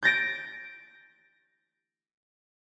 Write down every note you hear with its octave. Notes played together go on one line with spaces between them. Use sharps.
G6 A6 A#6 D7